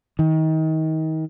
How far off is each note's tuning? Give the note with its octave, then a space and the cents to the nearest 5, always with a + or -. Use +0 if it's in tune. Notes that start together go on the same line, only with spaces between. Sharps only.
D#3 +30